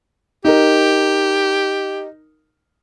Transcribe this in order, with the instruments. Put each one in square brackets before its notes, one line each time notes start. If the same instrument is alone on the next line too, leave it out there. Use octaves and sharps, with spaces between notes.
[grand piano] D#4 A#4 [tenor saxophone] G4